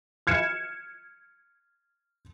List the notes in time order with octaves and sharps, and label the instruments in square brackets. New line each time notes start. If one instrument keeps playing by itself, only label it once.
[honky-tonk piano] F6 G#6 C#7 E7